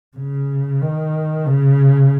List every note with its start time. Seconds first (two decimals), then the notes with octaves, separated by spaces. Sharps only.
0.17 C#3
0.81 D#3
1.46 C#3